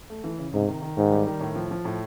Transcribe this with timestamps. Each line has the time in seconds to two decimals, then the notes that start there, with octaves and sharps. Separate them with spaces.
0.10 A3
0.24 E3
0.39 C#3
0.53 G#2 C3
0.68 D#3
0.82 D#3
0.97 G#2 D#3
1.11 G3
1.26 D#3
1.41 A2
1.56 F3
1.71 F3
1.85 A2